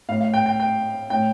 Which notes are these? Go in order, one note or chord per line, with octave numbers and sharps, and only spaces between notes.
A2 F5
F5
G5
G5
G5
A2 G5